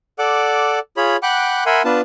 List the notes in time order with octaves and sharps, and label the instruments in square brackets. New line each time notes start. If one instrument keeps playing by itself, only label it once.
[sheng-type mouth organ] A4 D5 F#5 D6
F4 G#4 C#5 B5
F#5 G5 B5 D6 F#6
A#4 E5 F#5 G#5 B5 C6
B3 D4 F4 B4 A5